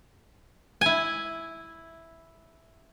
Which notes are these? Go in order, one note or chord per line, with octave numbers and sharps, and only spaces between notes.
E4 G#5